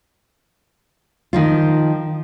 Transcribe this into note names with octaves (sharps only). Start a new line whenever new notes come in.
D#3 F3 F4